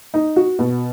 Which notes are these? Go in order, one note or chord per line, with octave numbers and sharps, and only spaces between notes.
D#4
F#4
B2